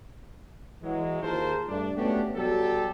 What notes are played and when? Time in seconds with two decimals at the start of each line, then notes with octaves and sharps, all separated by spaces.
0.83 E3 F#3 G#3
1.23 D#2 F4 G#4 A#4 C5 A5
1.68 G2 G3 A3 D4
1.97 A3 B3 C#4 D4 F#4 G4
2.36 B2 F#3 G3 G4 A4